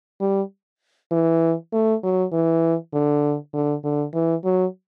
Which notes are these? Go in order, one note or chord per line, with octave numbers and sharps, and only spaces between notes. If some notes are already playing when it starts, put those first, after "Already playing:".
G3
E3
A3
F#3
E3
D3
D3
D3
E3
F#3